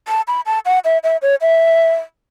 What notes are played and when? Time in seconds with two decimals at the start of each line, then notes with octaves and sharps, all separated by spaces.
0.08 A5
0.28 B5
0.46 A5
0.66 F#5
0.85 E5
1.04 E5
1.22 C#5
1.41 E5